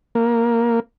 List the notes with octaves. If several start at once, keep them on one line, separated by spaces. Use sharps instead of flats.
A#3